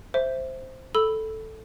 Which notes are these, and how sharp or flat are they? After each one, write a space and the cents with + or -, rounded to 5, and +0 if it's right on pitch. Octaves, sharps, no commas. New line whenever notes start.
C5 +0 E5 +0
A4 +0 B5 +0 E6 +0